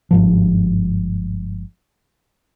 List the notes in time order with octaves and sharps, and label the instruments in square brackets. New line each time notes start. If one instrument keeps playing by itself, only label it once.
[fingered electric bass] G1 G#2 F3